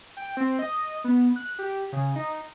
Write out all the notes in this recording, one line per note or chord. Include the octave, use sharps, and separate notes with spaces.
G5
C4
D#5
B3
F#6
G4
C#3
D#4